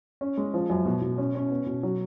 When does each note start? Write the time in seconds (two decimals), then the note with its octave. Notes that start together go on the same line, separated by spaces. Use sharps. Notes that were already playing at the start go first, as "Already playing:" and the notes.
0.21 C#4
0.37 G#3
0.54 F3
0.70 F#2
0.85 B2
1.02 B2
1.18 C#4
1.35 C#4
1.51 B3
1.66 B2
1.83 F#3